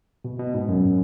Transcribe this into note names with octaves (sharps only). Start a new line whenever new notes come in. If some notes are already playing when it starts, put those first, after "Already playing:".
B2
B2
G#2
F#2